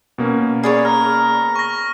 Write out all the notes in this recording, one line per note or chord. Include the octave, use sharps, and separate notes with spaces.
B2 A#3 C#4
G#4 B4 C#5 D5
A#5 F6
C#6 A#6